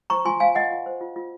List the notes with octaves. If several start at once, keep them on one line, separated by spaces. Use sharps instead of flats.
C5 A#5 C#6
F4 G#5 C6
C5 F5 G#5
F4 D#5 F#5
F4
C5
F4
F4